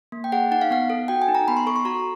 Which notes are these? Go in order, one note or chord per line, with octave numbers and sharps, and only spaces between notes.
A#3
G5
G#4 F#5
D#4 F#5
F5
B3 F#5
A4
F#4 G5
G#5
D#4
A#5
B3 B5
C6
A4 C#6
C6
F#4 A#5